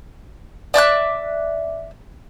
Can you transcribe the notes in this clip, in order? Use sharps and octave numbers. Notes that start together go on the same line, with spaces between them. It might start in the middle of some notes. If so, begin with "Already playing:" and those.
D5 E5 D6 F#6